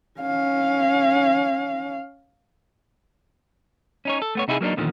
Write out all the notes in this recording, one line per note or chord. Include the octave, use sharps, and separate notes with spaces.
C#4 F5
C#4 D#4 C#5
A4
A3 B3 C#5
C3 D#4 E4 F#4 G#4
F#3 A#3 C4 D4 D#4
E2 A#2 D3 D#3 F3